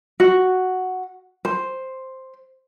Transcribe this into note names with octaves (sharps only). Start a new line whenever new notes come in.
F#4
C5